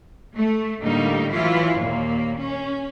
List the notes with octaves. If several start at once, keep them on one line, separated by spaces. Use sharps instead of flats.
A3
A2 D3 G3 A#3 D#4
E3 F#3 E4 F4
D#2 A#2 A#3
C#4